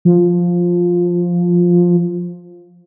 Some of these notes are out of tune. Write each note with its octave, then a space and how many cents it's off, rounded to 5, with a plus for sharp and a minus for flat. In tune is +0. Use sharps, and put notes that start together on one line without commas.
F3 +5